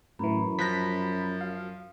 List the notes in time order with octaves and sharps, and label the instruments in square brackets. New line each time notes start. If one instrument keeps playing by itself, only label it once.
[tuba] F#2 [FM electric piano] A2 E3 [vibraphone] C#4 A#5 B5
[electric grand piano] F3 F#6 A#6 [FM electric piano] B6
[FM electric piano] F5